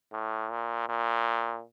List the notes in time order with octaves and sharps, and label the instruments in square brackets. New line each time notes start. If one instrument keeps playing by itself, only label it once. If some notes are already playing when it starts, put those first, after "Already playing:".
[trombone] A2
A#2
A#2